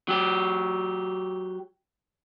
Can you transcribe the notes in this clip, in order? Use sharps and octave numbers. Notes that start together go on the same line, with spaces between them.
F#3 G4